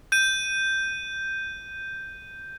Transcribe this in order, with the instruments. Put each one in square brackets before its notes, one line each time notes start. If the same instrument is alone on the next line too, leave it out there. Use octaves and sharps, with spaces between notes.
[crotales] G6 D#7